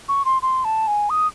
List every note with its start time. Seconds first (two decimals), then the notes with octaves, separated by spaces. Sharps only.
0.09 C#6
0.25 C6
0.42 C6
0.65 A5
0.87 G#5
1.10 D#6